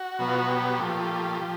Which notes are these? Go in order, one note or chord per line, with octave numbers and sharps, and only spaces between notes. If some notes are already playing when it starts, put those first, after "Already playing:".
Already playing: F#4
B2 F#3 B3
F4
F#4
G4
A#2 F3 A3
F3